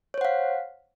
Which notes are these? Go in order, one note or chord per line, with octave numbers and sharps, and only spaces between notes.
C5 C#5 F5 F#5